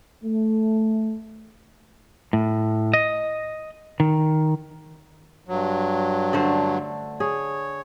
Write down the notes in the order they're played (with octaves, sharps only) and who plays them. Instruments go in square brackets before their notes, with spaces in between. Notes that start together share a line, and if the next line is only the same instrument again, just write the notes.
[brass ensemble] A3
[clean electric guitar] A2
D#5
D#3
[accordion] G2 F#3
[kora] D3 A3 C5
[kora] G#4 [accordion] C#5